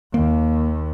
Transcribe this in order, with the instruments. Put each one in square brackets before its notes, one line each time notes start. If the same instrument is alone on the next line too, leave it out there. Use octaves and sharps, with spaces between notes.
[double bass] D#2 [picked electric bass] A#3